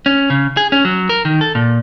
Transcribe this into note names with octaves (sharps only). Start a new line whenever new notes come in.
C#4
C#3
G#4
C#4
F#3
A#4
D#3
A4
A#2